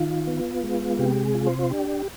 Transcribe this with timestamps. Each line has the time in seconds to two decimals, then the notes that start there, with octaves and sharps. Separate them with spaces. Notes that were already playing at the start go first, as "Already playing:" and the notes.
Already playing: D#3 F4
0.27 B3
0.63 G#3
0.99 C3 G4
1.23 G#4
1.35 F4
1.47 C5
1.59 F4
1.70 D4 G4